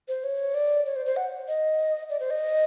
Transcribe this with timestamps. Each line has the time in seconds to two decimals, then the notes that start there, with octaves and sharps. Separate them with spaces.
0.08 C5
0.24 C#5
0.54 D5
0.86 C#5
0.96 C5
1.06 C5
1.16 F#5
1.48 D#5
2.10 D5
2.20 C5
2.30 D#5